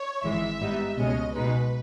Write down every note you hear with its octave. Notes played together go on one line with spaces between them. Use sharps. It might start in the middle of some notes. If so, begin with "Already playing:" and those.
Already playing: C#5
G#1 G#2 E3 G#3 E5
G#2 G3 B3 D#4
C#2 B2 G#3 C#4 D#5
B1 B2 G#3 D#4 B4